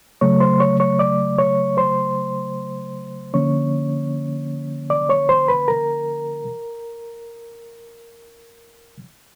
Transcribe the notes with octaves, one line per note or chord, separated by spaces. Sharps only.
C#3 F#3 A3 C#5 C#6
C5 C6
C#5 C#6
C#5 C#6
D5 D6
C#5 C#6
C5 C6
D3 F3 A#3 C#4 C#5 C#6
D5 D6
C#5 C#6
C5 C6
B4 B5
A#4 A#5